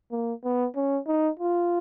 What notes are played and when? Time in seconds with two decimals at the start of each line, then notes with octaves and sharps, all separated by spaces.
0.12 A#3
0.44 B3
0.76 C#4
1.07 D#4
1.40 F4